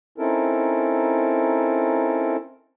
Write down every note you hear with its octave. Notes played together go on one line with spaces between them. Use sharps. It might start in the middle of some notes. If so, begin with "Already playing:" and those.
C4 C#4 D#4 E4 A4 A#4